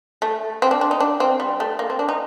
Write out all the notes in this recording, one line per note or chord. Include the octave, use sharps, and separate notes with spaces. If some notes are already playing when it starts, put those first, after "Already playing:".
A3
C4
D4
D4
D#4
D4
C4
G3
A3
A#3
C4
D4
D#4